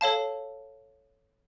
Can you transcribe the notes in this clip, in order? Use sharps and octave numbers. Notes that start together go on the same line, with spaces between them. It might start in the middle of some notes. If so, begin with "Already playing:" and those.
A4 C#5 F5 A5